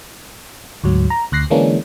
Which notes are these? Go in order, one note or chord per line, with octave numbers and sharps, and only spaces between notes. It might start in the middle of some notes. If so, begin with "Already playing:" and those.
D2 G#2 F#3
A#5
D2 F#6 A#6 C7
D3 E3 G#3 A#3 C#4 D4